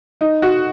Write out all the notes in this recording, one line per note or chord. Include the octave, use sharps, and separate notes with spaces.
D#4
F#4